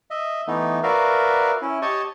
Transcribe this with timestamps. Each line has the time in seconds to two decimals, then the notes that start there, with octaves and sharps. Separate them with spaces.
0.11 D#5 E5
0.47 E3 A3 B3 D#4
0.83 F#4 A#4 B4 D5 E5 F5
1.62 C#4 E4
1.82 G4 C#5 D#5 A5 C#6